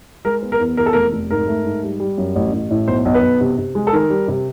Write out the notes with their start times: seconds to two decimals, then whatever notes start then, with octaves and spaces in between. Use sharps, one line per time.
0.25 G#3 A#4
0.42 B3
0.52 A#4
0.60 E2
0.77 E2 A#4
0.86 A4
0.93 F1 A#4
1.12 F1
1.31 G#2 A#4
1.47 A3
1.65 G#2
1.83 G3
2.00 G3
2.18 F#2
2.36 A1
2.53 A1
2.70 A2
2.87 B1 C5
3.05 B1
3.14 B4
3.22 B1
3.41 C3
3.58 C3
3.75 G#3
3.87 A4
3.93 D#3 A#4
4.10 G3
4.28 C3